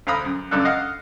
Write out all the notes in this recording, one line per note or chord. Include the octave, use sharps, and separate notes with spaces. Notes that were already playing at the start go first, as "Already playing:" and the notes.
D2 C5 F5 A#5 B5 D#6
F#2
C#2 F#2 D4 A4 F#6
D#5 F5 F#5